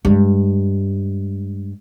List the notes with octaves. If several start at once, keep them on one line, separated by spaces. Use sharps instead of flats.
G2 G#3